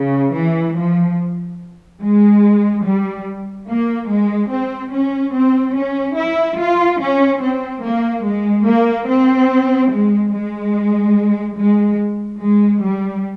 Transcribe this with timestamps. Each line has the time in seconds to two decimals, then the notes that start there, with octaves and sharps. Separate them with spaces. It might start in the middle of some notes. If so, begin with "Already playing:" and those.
Already playing: C#3
0.35 E3
0.77 F3
2.01 G#3
2.84 G3
3.68 A#3
4.09 G#3
4.50 C4
4.92 C#4
5.33 C4
5.75 C#4
6.16 E4
6.59 F4
7.00 C#4
7.41 C4
7.83 A#3
8.25 G#3
8.67 A#3
9.08 C4
9.92 G#3
10.34 G#3
11.57 G#3
12.42 G#3
12.83 G3